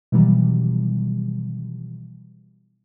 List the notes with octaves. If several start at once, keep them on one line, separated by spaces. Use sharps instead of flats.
B2 D#3 E3 F#3 G3